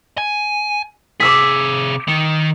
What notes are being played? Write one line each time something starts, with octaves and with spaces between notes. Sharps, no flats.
G#5
C3 G#4 D6 E6 B6
D#3